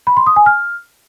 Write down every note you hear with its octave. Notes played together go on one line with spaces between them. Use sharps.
B5
C6
D#6
G#5
F6